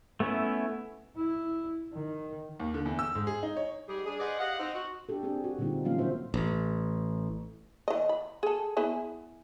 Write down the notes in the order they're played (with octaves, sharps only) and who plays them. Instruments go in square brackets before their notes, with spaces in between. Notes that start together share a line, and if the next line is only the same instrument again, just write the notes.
[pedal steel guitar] A3 B3 C#4 E4
[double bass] E4
D#3
[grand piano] D#2
D3
E2
E6
G#2
G#4
D#4
C#5
[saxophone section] G#2 G3 G#4
D4 G#4
G#4 B4 C5 D5 D#5 F#5
G4 G#4 D#5 F5 F#5
C4 D#4
F#4
[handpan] D4 G4 A4
C4 D4 G4 G#4
F#4
A#2 D3 G3 C4 D#4 F4
E3 F#3 A#3 C#4 F4 F5
C#3 A3 B3 F#4 C5 E5
[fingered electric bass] A1
[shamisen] E3 D#5
B5
G#4 A4
B3 E4 G#4